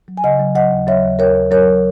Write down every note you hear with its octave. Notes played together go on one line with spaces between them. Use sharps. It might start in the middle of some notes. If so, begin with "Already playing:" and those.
F#3
G#5
C#3 D#5 F#5
F#3
F#3 D#5 F#5
D#2
F#3 C#5 E5
D#2
D#2 A#4 C#5
D#2
F#3 A#4 C#5